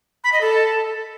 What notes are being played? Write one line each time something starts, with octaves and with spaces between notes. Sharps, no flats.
B5
D#5
A4